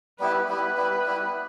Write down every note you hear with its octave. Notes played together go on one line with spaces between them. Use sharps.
G3 B3 E4 G4 B4
G3 B3 E4 G4 B4
G3 B3 E4 G4
G3 B3 E4 G4